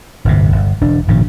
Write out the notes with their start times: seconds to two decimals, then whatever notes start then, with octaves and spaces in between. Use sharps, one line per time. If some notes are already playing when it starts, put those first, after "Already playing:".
0.25 D1 G1 C3
0.52 G1
0.81 E1 D4
1.08 G#1 A#2 C#3 F3